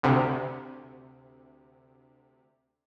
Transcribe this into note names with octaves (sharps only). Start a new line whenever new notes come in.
D2 C3